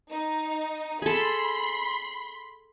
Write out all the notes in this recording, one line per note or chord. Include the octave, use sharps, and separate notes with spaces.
D#4
G#4 A4 B5 C6